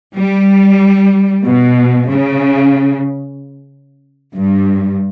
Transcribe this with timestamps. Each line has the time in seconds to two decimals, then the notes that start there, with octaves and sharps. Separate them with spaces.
0.15 G3
1.45 B2
2.09 C#3
4.36 G2